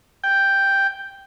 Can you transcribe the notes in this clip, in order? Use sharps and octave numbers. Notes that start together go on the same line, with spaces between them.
G5